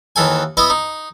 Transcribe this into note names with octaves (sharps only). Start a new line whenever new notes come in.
D#2 E3 A4 G#5
B3 E4 B4 D#5
D#4